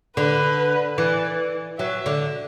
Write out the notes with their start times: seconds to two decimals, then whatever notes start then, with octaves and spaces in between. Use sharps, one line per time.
0.17 D3 B4
0.98 E3 D5
1.79 F#3 E5
2.06 D3